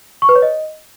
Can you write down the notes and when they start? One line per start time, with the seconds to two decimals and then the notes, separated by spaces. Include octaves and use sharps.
0.22 C#6
0.29 B4
0.36 C#5
0.42 D#5